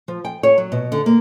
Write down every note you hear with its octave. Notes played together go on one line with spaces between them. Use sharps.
F3
G5
C#5
F#3
B2
D3
A#3